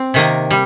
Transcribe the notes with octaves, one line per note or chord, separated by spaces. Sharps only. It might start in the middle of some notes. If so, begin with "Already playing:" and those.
Already playing: C4
C3 D#3 A#3
G3